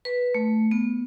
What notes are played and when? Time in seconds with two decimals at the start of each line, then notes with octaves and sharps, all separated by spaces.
0.05 B4
0.34 A3
0.71 B3